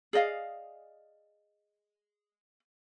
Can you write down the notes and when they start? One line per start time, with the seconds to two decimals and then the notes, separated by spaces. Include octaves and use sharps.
0.13 G#4 D5 D#5 F5